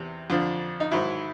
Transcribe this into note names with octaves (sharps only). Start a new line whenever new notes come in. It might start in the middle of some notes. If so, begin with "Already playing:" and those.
Already playing: E2 C3
F2 D3 F3
D#4
G#2 D#3 F#3 E4